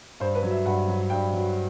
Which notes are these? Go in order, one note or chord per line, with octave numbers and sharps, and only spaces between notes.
G2 C5
B4
F#3
E5
G2 F#5
F#3
G2 G5
F#3